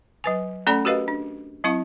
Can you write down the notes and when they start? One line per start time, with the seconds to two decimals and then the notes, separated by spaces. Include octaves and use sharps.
0.24 F#3 B4 G#5
0.67 A3 C#4 A4 D5 G#5 B5
0.85 F#4 G4 A#4 B4 D#5 F5
1.08 D4
1.64 F#3 C4 E4 F5 C#6